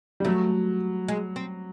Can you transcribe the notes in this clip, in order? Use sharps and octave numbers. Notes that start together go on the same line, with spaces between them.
G3
F#3 A3
G#3
C4